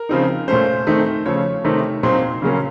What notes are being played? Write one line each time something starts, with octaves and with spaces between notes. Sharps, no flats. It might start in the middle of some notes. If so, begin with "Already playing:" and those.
Already playing: A#4
C#3 F3 C4 D#4
A#2 A3 C#4 C5
D#3 A3 C4 D#4
C#3 F3 A3 C#5
C3 D#3 A3 D#4
A#2 F#3 C4 D#4 C6
C#3 F#3 A#3 C#4